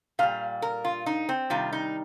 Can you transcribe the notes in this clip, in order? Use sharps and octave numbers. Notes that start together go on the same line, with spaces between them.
A#2 G3 F5
A#4
F4
D#4
C4
C3 D#3 G3 F4
D#4